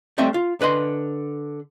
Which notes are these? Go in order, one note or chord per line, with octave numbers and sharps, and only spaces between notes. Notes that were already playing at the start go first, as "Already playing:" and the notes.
G3 A3 C4 D#5 E5
F4
D3 B4 D#5 C6